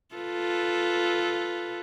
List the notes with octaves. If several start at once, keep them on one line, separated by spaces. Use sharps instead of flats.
F4 A4 B4